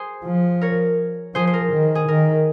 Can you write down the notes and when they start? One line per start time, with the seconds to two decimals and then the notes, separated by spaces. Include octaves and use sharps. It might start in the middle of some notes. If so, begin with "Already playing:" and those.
Already playing: G#4 C5
0.25 F3
0.61 A#4 C#5
1.35 F3 G#4 C5
1.47 C5
1.53 A#4
1.72 D#3
1.95 G#4
2.08 D#3 A#4